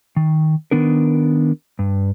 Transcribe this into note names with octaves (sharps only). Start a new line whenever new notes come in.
D#3
D#3 B3 D4 A#4
G2